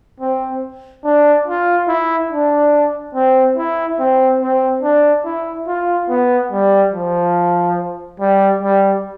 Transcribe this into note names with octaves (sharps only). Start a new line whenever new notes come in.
C4
D4
F4
E4
D4
C4
E4
C4
C4
D4
E4
F4
B3
G3
F3
G3
G3